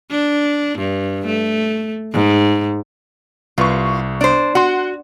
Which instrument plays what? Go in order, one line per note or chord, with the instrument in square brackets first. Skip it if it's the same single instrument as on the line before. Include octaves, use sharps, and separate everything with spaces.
[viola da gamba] D4
G2
A3
G#2
[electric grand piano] C2 B4 C#6 [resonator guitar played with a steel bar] F4
[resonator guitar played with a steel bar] D4 C5
[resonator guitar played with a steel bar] F#4 [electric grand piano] F#5 C6